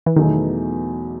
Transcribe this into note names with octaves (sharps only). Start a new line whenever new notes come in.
E3
E2 B2 D#3 F#3 A3 D#4